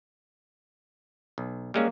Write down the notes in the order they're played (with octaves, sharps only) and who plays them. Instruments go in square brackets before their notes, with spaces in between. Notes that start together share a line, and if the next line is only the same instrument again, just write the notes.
[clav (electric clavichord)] B1
[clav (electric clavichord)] G3 G#3 C#4 [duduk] A#3